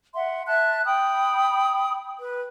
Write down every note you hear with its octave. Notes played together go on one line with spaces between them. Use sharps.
E5 F#5 C6
E5 A5 F#6
G5 B5 D#6
B4